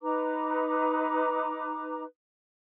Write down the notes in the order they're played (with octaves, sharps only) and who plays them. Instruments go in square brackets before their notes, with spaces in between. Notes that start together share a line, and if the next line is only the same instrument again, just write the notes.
[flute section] D#4 B4 A#5 D6